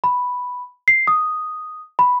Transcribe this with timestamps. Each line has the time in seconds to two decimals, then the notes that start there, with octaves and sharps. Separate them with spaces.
0.04 B5
0.88 C7
1.07 D#6
1.99 B5